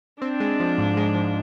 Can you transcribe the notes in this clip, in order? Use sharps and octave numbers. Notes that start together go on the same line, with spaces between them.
C4 D4
G#3
F3
G#2
G#3
F3